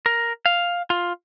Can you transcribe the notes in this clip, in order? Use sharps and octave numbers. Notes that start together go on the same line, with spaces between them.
A#4
F5
F4